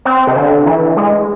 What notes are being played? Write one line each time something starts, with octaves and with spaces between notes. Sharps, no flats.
C4
C3
D3
E3
G#3